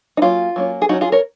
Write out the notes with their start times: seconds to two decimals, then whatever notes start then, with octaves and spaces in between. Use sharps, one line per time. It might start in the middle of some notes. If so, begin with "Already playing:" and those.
0.17 D#4
0.22 F#3 A#3 C#4 F4
0.56 F#3 A#3 C#4
0.82 G#4
0.89 F#3 A#3 C#4 D#4 F#4
1.01 F4 G#4
1.12 A#4 C#5